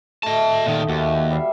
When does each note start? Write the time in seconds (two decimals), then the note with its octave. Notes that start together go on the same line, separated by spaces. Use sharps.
0.23 A3 A4 D#5 A5
0.66 A#2 D#3
0.89 D#2 F#4 G4 E5
1.30 G3 E5 F5